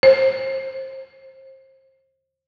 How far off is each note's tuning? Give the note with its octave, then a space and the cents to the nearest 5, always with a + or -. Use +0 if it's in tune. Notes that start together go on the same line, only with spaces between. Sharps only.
C5 +30